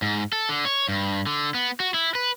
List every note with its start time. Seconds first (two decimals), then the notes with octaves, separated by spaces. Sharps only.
0.02 G#2
0.33 A4
0.49 D3
0.65 C#5
0.89 G2
1.26 D3
1.54 B3
1.80 F#4
1.94 E4
2.15 B4